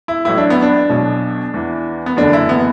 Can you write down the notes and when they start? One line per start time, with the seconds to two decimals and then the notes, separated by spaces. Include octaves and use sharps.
0.08 E4
0.25 A1 A2 F#3 E4
0.38 D4
0.50 B3
0.62 D4
0.90 B1 B2 F#3
1.54 E2 E3
2.06 B3
2.17 F#1 E2 D3 F#3 D4
2.33 E4
2.49 B3